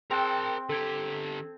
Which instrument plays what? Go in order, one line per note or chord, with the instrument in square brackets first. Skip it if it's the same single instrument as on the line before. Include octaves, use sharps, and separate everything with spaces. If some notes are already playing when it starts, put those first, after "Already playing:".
[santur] C4 [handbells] G#4 G5 F#6 [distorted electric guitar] A#4 A5
[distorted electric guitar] D3 G4 [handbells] A4 G#6